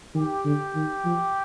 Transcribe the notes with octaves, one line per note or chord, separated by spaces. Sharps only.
D#3 G4
D3
D#3
F3